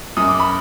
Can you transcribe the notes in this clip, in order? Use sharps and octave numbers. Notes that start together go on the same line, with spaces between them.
F#2 D#6
D6
B5